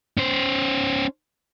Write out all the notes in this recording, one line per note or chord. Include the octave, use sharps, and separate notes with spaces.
C#4 C5